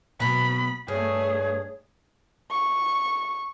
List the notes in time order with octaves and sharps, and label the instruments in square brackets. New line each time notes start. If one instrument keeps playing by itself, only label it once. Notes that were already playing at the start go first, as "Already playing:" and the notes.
[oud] B2 F#3 [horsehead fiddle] B5
[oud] G2 [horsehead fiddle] A3 G#4 [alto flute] C#5
[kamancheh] C#6